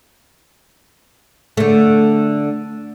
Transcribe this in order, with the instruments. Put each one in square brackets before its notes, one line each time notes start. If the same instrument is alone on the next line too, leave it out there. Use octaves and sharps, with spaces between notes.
[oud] D3 A3